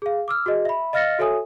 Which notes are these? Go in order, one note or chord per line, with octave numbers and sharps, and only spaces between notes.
G#4 F5
D6 E6 F6
F#4 G#4 D#5
E5 B5
D#5 F5 F6 A6 A#6 C#7
F#4 A4 C#5 E5 G#5 D#6